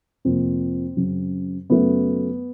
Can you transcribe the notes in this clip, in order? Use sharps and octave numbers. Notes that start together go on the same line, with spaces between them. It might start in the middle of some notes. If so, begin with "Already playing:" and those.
F2 C3 F3 A#3 C4
F#2 C#3 F#3
F#2 C#3 F#3 A3 B3